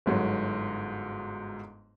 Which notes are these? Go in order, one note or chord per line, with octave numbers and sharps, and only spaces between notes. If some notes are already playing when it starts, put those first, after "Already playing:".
G1 G#2 F#3